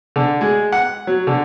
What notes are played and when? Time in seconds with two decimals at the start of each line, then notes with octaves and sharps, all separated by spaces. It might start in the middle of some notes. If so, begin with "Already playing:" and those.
0.16 D3
0.41 G#3
0.72 F#5
1.07 F#3
1.27 D3